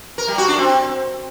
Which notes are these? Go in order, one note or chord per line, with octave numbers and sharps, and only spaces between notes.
A#4
G3
F#4
D4
C4